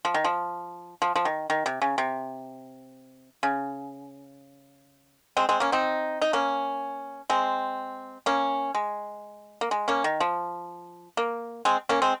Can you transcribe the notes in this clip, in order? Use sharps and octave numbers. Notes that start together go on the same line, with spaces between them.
F3
D#3
F3
F3
F3
D#3
D#3
C3
C#3
C3
C#3
G#3 C4
G#3 C4
A#3 C#4
C4 D#4
D#4
A#3 C#4
G#3 C4
A#3 C#4
G#3
A#3
G#3
A#3 C#4
D#3
F3
A#3
G#3 C4
A#3 C#4
G#3 C4